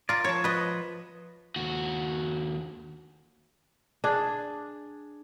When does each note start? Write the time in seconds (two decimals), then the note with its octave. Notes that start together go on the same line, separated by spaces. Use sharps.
0.09 F4 A#4 D5
0.25 F3 C#5 A5
0.44 B4 D#5
1.56 D#2 F#4
4.04 D4 G#4